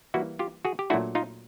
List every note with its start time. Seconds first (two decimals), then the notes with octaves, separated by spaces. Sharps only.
0.14 E3 G3 A#3 E4 F#4
0.39 F4 G4
0.65 F#4 G#4
0.79 G4
0.90 A#2 F#3 A3 D4 E4 F#4
1.15 D#4 F4